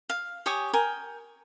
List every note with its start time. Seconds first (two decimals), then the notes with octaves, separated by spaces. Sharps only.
0.10 F5
0.46 G4 C#5 G#5 D#6
0.73 A#4 G5 G#5